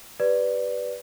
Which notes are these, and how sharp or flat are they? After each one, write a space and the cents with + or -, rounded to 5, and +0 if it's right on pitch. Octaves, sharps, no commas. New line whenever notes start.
G4 +0 B4 +0 D5 +0